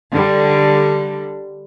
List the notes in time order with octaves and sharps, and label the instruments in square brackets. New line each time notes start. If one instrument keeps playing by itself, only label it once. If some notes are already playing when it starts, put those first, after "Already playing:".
[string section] D3 G3